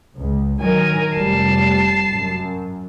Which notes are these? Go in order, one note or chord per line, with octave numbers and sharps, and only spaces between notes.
C#2
D#3 F#3 A#4 G#5
F1 G3 A5 C7
F#2